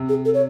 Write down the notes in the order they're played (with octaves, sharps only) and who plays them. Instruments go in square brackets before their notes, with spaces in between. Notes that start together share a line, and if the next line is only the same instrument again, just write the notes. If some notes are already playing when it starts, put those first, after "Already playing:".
Already playing: [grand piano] C3
[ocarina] G#4
A4
C#5